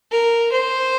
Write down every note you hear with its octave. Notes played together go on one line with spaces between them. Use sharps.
A#4
C5